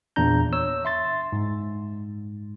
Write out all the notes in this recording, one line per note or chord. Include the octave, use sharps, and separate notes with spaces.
E2 A#2 D4 A#5 G6
C#5 E6
E5 C6 A6
G#2